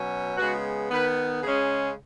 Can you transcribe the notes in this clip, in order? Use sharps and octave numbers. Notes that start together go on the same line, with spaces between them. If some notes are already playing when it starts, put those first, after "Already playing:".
Already playing: B2 F#3 C#4
C#3 G#3 B3 F#4
D#3 B3 B4
C#3 G#3 C#4 G#4